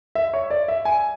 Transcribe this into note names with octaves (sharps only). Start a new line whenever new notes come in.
E5
C#5
D5
E5
G#5